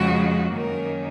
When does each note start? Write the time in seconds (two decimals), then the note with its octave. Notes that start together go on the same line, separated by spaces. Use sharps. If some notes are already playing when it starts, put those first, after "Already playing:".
Already playing: F2 C#3 G#3 F#4
0.55 F#2 D#3 A#3 C#4 A#4